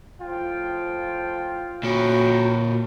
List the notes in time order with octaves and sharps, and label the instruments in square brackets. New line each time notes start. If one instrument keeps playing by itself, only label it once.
[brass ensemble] A2 F3 G5 [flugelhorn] F4
[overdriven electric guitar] A#2 C#5 [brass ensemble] C#4 G5 A#5 [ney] F#4